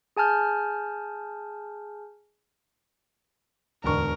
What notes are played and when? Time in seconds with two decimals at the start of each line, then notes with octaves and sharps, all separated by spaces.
0.17 G#4 G#5 A5 F6 G6
3.84 E1 D2 G#2 D3 D4 A#4 C#6